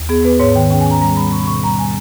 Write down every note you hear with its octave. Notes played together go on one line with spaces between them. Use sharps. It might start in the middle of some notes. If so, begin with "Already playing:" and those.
Already playing: D#2
B3 G#4
B3 B4
G#2 C#5
D#3 G5
C#4 G5
G#5
C#4 A#5
G3 A#5
G3 B5
B2 C#6
B5
B2 C#6
G3 A#5
G3 G#5